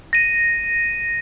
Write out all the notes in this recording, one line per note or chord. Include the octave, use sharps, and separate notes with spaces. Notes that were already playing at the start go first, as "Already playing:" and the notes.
A#6 D#7